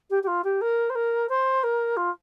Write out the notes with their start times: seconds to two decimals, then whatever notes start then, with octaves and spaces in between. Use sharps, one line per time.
0.10 G4
0.23 G4
0.27 F4
0.44 G4
0.61 A#4
0.89 C5
0.95 A#4
1.29 C5
1.63 A#4
1.96 F4